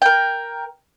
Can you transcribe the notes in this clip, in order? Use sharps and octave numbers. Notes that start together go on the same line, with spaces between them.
A#4 G5